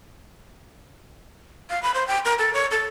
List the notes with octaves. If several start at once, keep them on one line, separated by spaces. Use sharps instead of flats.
F5
B5
C5
G5
A#4
A4
C#5
A4